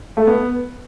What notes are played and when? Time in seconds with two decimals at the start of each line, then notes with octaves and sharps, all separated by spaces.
0.17 A3
0.27 B3